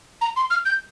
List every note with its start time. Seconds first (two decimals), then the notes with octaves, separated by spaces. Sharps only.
0.21 A#5
0.36 C6
0.51 F6
0.66 G6